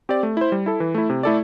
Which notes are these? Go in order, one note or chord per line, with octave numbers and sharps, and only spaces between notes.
C4 G4 D5
A3
E4 C5
G3
E4 A4
E3
A3 E4
C3
A3 E4 A4 D5